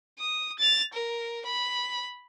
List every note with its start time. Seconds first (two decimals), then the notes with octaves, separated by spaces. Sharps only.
0.19 D#6
0.59 A6 F7
0.93 A#4
1.45 B5